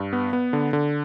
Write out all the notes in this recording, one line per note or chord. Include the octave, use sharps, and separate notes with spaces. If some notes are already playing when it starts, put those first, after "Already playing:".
Already playing: G2
B3
B3
D3
D3